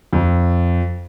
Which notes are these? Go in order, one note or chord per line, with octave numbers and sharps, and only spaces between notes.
F2